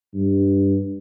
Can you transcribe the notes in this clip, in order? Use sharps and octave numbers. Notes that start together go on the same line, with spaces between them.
G2